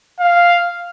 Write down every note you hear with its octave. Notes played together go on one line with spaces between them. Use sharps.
F5